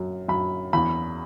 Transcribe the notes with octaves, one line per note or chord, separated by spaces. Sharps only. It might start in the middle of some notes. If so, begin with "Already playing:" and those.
Already playing: F#2
F#2 B5
E2 B5